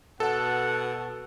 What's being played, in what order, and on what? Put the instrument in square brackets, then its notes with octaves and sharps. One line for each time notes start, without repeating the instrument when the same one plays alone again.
[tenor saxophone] B2 [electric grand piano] A4 [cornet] F#5